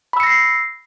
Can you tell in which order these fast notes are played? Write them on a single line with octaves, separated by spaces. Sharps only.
B5 E6 C#7 A#6 C7